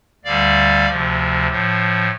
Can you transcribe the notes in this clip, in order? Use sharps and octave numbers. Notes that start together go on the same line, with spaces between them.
D2 D3 G3 D5 F5
D2 C3 F3
A2 F3